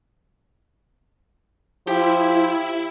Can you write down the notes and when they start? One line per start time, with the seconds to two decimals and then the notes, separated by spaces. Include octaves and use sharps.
1.87 F3 E4 G4